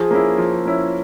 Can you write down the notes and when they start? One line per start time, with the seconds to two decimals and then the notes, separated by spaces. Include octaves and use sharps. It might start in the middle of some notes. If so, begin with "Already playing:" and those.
Already playing: F3 G#4
0.11 A#3 C#4 E4
0.38 F3
0.65 A#3 C#4 E4